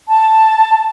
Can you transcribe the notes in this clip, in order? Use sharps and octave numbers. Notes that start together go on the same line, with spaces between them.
A5